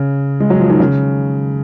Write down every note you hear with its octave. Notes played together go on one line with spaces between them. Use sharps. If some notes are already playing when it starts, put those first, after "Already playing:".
Already playing: C#3
G#3
F#3
F3
D#3
C#3